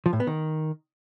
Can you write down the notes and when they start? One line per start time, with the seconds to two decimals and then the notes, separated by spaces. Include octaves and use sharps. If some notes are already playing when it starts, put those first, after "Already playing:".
0.06 F3
0.13 A2
0.20 B3
0.27 D#3